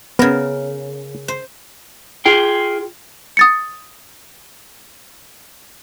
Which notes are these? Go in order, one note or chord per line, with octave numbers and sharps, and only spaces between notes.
C#3 B3 A#4
C5
F4 G#4 G5
D#6 A6 C#7